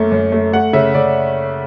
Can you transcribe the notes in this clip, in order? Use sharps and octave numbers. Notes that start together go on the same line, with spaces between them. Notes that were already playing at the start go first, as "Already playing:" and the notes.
Already playing: F#2 A3 A#3
F#2
A3
A3 F#5
C#3 E5
C#3 D5